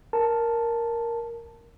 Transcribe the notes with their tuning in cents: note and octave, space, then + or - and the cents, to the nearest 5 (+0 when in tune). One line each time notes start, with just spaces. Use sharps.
A#4 +0 A5 +0